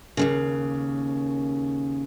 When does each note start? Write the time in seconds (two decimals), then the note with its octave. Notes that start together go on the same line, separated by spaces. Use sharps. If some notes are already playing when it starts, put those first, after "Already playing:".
0.17 D#2 A#2 C#3